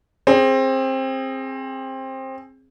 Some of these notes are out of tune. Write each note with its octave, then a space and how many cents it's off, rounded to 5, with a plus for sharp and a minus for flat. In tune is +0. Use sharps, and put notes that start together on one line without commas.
C4 +20 G#4 -5